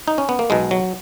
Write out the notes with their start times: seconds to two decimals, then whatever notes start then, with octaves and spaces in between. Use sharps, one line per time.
0.08 D#4
0.18 C#4
0.29 B3
0.39 A#3
0.50 B1 B2 G#3
0.71 F#3